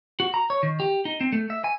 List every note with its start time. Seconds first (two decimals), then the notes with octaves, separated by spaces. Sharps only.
0.20 F#4
0.34 A#5
0.50 C#5
0.63 D#3
0.80 G4
1.05 D#4
1.21 C4
1.33 A3
1.50 E5
1.64 G#5